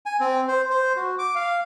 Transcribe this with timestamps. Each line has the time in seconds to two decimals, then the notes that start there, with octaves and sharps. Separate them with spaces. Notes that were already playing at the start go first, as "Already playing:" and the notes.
0.06 G#5
0.20 C4
0.48 C5
0.70 C5
0.96 F#4
1.19 D6
1.35 F5